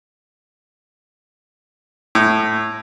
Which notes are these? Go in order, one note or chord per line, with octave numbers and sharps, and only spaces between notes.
A2